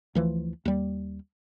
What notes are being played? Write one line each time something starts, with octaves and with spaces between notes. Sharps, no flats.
D2 E3 F3
D#2 G3